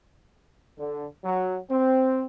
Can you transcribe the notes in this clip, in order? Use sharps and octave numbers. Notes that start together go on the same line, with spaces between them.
D3
F#3
C4